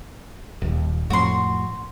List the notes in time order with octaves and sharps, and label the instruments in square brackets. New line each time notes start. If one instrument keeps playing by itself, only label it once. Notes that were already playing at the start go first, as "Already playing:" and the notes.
[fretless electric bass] D#1 D#2
[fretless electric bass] F2 A2 [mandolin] F#4 C6